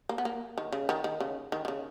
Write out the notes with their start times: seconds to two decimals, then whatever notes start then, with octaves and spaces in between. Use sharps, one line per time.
0.09 A#3
0.18 B3
0.25 A#3
0.58 D#3
0.73 C#3
0.89 D#3
1.04 D#3
1.20 C#3
1.52 D#3
1.65 D#3
1.68 C#3